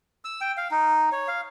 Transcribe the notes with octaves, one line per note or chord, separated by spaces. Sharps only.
E6
G5
F5
D#4
C#5
F5